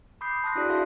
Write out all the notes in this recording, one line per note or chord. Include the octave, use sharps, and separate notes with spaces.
B5 D6 D#6 G6 C7
A5 C6 D#6 F#6 A#6
D4 E4 F#4 G#4 D5
D4 E4 A4 E5 F5 C6